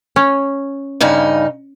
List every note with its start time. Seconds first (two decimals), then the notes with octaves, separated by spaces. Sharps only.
0.16 C#4
1.01 G2 C#3 D#4